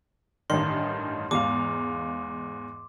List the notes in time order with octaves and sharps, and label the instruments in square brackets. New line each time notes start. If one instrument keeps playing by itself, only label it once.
[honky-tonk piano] A1 G2 D#3 [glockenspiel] C6
[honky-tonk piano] E2 G#2 F5 [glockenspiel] D6